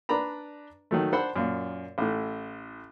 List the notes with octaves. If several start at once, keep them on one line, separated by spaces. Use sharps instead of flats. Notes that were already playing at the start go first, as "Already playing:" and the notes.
D4 B4 D5 A#5 B5
D#3 F#3 A3
D4 C5 F#5 B5 C6
F#2 A#2
A1 A2